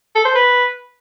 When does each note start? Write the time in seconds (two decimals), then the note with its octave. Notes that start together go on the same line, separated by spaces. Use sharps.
0.15 A4
0.25 C5
0.35 B4